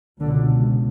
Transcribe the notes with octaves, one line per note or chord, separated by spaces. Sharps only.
C#2 B2 D3